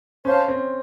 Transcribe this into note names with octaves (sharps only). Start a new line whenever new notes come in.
C#4 C5 F5 A5
C4